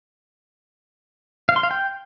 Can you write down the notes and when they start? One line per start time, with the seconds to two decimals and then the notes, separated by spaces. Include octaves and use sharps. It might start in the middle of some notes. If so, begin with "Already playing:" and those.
1.49 F5
1.56 C6
1.63 F5
1.71 G5